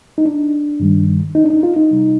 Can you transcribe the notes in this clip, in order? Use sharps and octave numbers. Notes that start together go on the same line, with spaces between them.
D#4
D4
G2 D#3 G3
D#4
D4
D#4
F4
D#4
C2 C3 G3